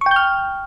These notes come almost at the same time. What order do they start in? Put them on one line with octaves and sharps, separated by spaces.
C#6 G5 G6 F6